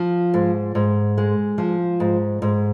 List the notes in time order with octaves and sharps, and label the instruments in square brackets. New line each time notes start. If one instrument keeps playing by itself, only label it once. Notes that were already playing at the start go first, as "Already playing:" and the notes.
Already playing: [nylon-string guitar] F3
G#2
G#2
G#3
F3
G#2
G#2